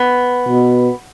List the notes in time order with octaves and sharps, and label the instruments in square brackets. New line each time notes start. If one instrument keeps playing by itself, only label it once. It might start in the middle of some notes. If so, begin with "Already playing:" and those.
Already playing: [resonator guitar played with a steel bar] B3
[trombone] B2